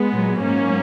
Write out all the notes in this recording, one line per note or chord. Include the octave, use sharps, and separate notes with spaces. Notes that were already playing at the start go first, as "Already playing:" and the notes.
Already playing: G#3 B3
A#2 F#3
G#2 F#3 A#3 C#4